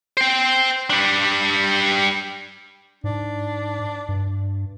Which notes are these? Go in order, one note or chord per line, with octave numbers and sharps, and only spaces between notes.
C5 G5
G3 D4
G#2 D4
G2